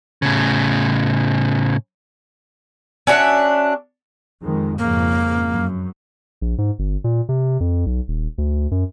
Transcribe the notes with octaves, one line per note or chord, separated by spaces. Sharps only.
A2 C#3
C#4 D4 F#4 E5
F2 D#3 G#3
F2 G#2 C#3 A#3
F#2
A#1
G#2
G1
A#2
C3
F2
B1
D#1
D2
F#2